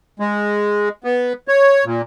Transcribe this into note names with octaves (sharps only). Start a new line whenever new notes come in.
G#3
B3
C#5
A#2